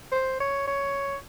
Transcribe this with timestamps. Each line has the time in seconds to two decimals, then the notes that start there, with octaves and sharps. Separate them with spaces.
0.12 C5
0.40 C#5
0.67 C#5